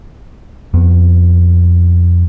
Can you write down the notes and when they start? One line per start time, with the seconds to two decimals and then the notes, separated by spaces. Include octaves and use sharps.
0.74 F2 B3